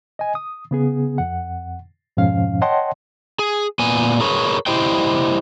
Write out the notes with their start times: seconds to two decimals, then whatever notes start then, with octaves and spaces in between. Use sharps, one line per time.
0.19 D#5 G#5
0.35 D#6
0.71 C#3 B3 G#4
1.18 F2 F#5
2.17 F2 G#2 B2 F3 C#4 F5
2.62 C#5 D#5 F#5 G5 A5 C6
3.39 G#4
3.79 A#2 B3 G#5
4.20 G#4 A#4 B4 C#5
4.67 E4 G4 C5 D#5 G5